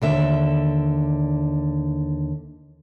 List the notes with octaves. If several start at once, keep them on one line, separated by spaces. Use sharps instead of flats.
D#2 D3 E5